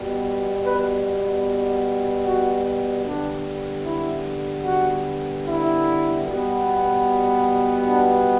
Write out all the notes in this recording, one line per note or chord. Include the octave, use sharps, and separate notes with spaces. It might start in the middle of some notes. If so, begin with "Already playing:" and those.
Already playing: B2 G3 B3
B4
F#4
D3 G3 B3 D4
E4
F#4
E4
B2 G3 B3
D4